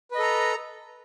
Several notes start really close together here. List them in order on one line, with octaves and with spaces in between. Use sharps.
B4 D#5 A4 A#5